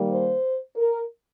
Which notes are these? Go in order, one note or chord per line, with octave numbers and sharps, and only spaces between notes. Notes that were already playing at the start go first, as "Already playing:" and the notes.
Already playing: D#3 G3 A#3
C5
A#4